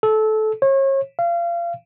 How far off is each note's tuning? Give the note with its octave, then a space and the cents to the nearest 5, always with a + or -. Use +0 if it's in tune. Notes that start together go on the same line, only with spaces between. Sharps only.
A4 -20
C#5 -35
F5 -30